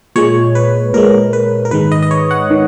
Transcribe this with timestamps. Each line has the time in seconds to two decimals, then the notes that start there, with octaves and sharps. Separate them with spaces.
0.16 A#2 G#3 C#5
0.55 B4
0.93 A#2 G#3 A#4
1.33 B4
1.65 A#4
1.71 G#2 D#3 G#3 B4
1.92 D#5
2.02 D#5
2.11 C#5
2.31 F#5
2.50 D#3